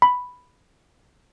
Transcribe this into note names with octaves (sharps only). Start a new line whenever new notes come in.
B5